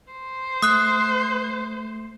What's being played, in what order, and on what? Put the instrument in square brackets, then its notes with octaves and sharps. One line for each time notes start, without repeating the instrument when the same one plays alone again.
[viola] C5
[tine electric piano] A3 [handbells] D#6 F#6